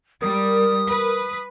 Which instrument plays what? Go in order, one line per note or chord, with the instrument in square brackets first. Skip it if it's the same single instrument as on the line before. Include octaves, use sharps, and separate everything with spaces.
[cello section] G3 [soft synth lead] A#4 [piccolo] D#6
[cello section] B4